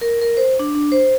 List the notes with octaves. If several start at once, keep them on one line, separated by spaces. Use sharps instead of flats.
A#4
A#4
C5
D4
D4
C5